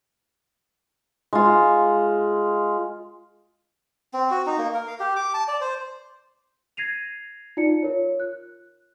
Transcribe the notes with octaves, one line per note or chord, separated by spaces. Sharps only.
G#3 F4
C4
F#4
D#4
A#3
A#4
F5
G4
D6
A5
D5
C5
G#6 A#6 C7 D#7 F7
D#4 F4 D5 C#7
F4 A#4 C#5
F#6